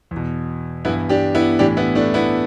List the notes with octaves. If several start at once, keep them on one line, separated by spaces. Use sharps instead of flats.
E2
B2
G2 E3 B3 E4
D4 G4
B3 E4
A2 E3 D4 G4
B3 E4
A3 D4
B3 E4